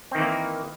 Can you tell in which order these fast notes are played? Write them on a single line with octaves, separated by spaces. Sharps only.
C4 D#3 E3 A#3